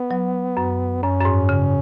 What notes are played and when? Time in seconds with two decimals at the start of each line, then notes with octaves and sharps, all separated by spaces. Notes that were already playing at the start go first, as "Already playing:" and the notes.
Already playing: B3
0.11 F#3
0.57 F#2
1.03 F#2 C#4
1.21 F#2
1.25 G#2
1.49 C#3